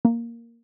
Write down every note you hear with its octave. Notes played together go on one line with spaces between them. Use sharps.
A#3